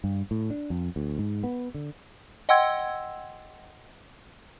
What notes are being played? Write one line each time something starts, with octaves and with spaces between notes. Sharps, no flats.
G2
A2
D4
F2
D2
G#2
B3
D3
D#5 F#5 G5 C6 E6 G#6